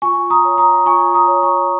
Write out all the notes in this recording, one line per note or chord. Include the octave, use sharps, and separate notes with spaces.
F4 G#5 C#6
A#5 D#6
C#5
A#5 D#6
F4 G#5 C#6
A#5 D#6
C#5
G#5 C#6